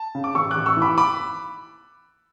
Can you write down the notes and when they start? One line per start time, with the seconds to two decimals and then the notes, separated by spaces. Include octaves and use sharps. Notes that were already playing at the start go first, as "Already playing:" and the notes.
Already playing: A5
0.15 C#3
0.24 D6
0.35 A1 C#6 E6
0.51 D6 F#6
0.56 A1
0.66 C#6 E6
0.77 E3
0.82 B5 D6
0.98 B5 D6